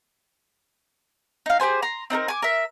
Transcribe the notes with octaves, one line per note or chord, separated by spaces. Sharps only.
D#4 F5
G4 G#4 C5 G#5
A#5 C6
C4 D#4 A4 A#4
G#5 D6
A#4 E5